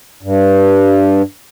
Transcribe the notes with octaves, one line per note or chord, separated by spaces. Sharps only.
G2